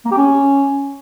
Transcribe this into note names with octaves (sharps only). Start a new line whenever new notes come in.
A#3
G4
C#4